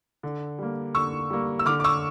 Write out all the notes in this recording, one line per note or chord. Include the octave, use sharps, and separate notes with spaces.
D3
G3 A#3
D3 C#6 E6
G3 A#3
E6
D3 D6 F6
D6
C#6 E6